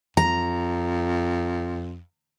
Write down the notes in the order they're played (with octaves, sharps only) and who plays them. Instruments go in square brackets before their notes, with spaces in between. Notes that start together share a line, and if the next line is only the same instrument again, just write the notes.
[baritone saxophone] F2 [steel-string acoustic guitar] A#5